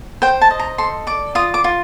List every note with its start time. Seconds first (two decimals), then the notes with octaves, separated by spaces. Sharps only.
0.22 C5 G5
0.41 A5
0.51 D#5
0.59 A#5
0.78 A4 C6
1.07 D5 D6
1.35 F4 D#6
1.54 D6
1.64 F4